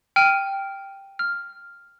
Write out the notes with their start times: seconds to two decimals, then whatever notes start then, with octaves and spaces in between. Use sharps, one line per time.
0.16 G5 F6 D#7
1.19 F6